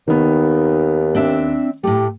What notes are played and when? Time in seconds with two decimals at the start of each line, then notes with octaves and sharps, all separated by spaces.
0.08 D#2 D#3 B3
1.15 C4 D4 E5
1.83 A2 A3 G4